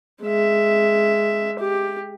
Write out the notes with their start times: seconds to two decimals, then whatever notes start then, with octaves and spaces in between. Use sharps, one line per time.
0.22 G#3 E5
1.59 G4